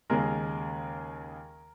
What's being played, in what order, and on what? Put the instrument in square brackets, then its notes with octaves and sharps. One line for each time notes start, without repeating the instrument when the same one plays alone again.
[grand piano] D#2 C#3 G#3 A#4